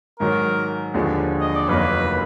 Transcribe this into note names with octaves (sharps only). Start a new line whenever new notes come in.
G#2 D#3 F#3 A#4
D#2 D3 F3 G#3 D4
D#5
D5
F1 F2 D#3 F#3 A#3 B4